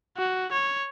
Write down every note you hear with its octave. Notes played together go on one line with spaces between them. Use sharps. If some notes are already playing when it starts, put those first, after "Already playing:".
F#4
C#5